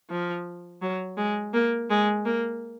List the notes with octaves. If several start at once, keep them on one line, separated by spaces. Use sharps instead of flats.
F3
F#3
G#3
A#3
G#3
A#3